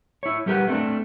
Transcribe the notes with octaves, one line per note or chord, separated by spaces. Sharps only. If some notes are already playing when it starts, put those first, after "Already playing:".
E4 C#5
G3 A3 G4 A#4 B4 F#5
A3 C4 D4